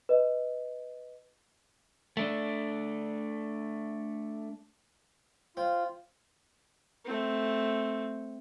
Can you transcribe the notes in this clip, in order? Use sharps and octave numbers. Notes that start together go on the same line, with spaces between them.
B4 D#5
A3 D4
C4 F4
A3 C4